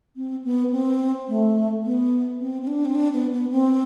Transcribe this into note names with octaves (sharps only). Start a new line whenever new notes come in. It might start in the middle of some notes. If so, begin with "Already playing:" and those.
C4
B3
C4
A3
B3
C4
C4
D4
C4
D4
B3
B3
C4